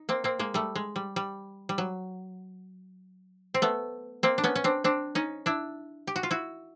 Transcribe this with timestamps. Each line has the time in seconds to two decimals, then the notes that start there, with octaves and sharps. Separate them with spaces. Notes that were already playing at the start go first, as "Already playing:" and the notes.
Already playing: D#4
0.09 A#3 C4
0.24 A#3 C4
0.39 G#3 A#3
0.54 G3 A3
0.76 G#3
0.96 G3
1.16 G3
1.69 G3
1.78 F#3
3.54 C4
3.62 A3 B3
4.23 A#3 C4
4.38 D4
4.44 B3 C#4
4.55 C#4
4.64 C4 D4
4.84 C4 D4
5.15 C#4 D#4
5.46 D4 E4
6.07 G4
6.16 F#4
6.23 F4
6.31 E4 F#4